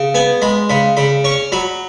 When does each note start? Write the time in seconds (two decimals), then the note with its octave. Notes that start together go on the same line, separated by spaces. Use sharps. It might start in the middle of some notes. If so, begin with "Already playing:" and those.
Already playing: C#3
0.14 B3 G#5
0.42 G#3 B5
0.69 C#3 B5
0.97 C#3 B5
1.24 C#4 C#6
1.52 F#3 B5